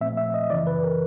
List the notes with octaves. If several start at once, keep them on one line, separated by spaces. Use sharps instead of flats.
A#2 F3 A3 C4 E5
E5
D#5
F#2 C#3 E3 D5
B4
A#4